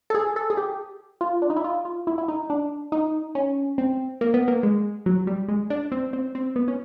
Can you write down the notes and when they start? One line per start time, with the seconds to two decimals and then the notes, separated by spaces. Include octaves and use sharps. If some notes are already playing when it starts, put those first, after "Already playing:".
0.10 A4
0.15 G#4
0.36 A4
0.50 G#4
0.57 G4
1.21 F4
1.42 D4
1.50 D#4
1.56 E4
1.64 F4
1.85 F4
2.07 E4
2.18 E4
2.28 D#4
2.50 D4
2.92 D#4
3.35 C#4
3.78 C4
4.21 A#3
4.34 B3
4.48 A#3
4.63 G#3
5.06 F#3
5.27 G3
5.48 G#3
5.70 D4
5.92 C4
6.13 C4
6.35 C4
6.56 B3
6.68 C#4